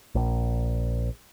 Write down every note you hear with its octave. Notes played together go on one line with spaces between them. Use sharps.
A#1